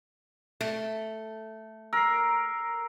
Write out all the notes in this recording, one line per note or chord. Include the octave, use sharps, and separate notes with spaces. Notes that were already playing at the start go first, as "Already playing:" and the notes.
A3
A#4 E6 C7